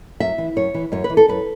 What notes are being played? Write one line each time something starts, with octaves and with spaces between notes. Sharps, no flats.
F#2 E5
E3
F#2 C#5
E3
F#2 C#5
B4
E3
A4
F#2 B4